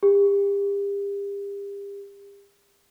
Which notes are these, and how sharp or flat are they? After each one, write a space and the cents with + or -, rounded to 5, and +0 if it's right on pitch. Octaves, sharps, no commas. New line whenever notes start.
G4 +35